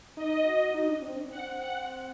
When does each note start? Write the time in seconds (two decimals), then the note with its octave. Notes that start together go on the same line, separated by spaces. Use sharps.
0.16 D#4 D#5
0.45 F#4
0.74 D#4
0.88 D4
1.02 C4
1.16 D4
1.30 C4 F#5
1.59 F#5